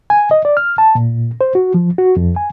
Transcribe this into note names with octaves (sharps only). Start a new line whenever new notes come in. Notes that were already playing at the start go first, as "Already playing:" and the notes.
G#5
D#5
D5
F6
A5
A#2
C5
F#4
F3
F#4
F2
G#5